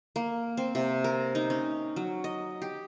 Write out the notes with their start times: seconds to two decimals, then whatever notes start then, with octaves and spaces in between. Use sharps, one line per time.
0.16 A#3
0.57 C4
0.75 C3
1.04 A#4
1.35 D#4
1.50 C#4
1.96 F#3
2.24 D#5
2.62 G4